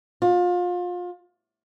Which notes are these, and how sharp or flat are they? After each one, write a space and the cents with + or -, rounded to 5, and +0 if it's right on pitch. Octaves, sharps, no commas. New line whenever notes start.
F4 +30